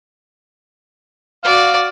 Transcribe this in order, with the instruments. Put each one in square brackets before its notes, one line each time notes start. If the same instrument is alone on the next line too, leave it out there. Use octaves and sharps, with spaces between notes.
[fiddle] F#4 D5 [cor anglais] F5